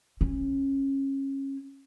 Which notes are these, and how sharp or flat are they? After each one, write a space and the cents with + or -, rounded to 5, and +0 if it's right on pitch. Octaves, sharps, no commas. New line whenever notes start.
C#4 -25